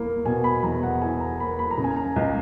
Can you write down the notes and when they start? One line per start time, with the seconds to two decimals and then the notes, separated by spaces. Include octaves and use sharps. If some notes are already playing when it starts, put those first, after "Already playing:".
Already playing: E2 A#3 E4
0.25 B2 G#5
0.44 B5
0.63 E2 A#5
0.83 F#5
1.01 E4 G#5
1.20 A#5
1.40 A#3 B5
1.59 B5
1.71 A#5
1.78 C#3
1.84 G#5
1.96 A#5
2.16 C#2